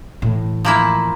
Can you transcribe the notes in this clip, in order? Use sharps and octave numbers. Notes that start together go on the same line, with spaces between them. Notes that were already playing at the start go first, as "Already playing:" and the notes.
A2 E3
F3 A#3 E4